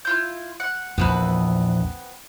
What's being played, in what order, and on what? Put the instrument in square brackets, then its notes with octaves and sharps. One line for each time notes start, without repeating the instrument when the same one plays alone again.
[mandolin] E4 F4 G6
F#5
[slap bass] A#1 E2 [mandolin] B3 C4 B4